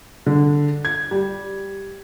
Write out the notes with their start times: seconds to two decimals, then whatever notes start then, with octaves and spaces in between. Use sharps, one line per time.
0.26 D3
0.85 G#6
1.11 G3